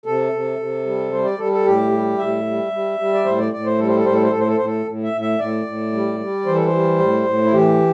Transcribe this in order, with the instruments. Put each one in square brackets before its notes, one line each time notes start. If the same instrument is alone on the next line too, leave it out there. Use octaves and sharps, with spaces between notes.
[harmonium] C3 A4
C3
C3
G3
G3 C5
D5
G3 A4
A4
A2 G4
G3
A2 E5
G3
G3
G3
D5
A2 C5
D5
A2 D5
C5
G3 A4
C5
A4
A2 C5
A4
C5
A2 A4
C5
A4
A2 C5
A4
A2
E5
A2
E5
A2 D5
A2
G3
G3
E3 C5
A4
C5
G3
A2
A2
E4
E3 G4